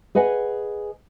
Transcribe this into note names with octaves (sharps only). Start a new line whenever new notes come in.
G#4 B4 D#5 F#5 G#5